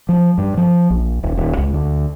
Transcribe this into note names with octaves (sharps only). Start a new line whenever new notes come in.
F3
G2
F3
A#1
D#1
D#1
C#2
D2